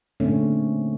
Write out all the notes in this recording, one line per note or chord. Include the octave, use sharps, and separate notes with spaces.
A#2 D3 A3 C4 C#4